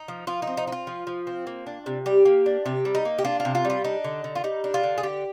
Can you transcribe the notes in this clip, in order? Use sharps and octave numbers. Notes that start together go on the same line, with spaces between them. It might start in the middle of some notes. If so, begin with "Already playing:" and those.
Already playing: D#4
F3
F3 F4
C4 D#4
D#4
D#4
F4
F3
F3
C4
A#3
D4
C3
G3 G4
A#3
D4
C3 G4
G3
D#4
A#3
G4
D4 F4
F4
C3
F4
G3
F4
D4 D#4
D3
D3
F4
G3 D#4
D4
F4
D3
G#4
D3 G4